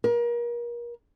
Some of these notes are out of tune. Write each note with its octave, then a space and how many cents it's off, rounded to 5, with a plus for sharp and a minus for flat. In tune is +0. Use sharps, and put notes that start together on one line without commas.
A#4 +35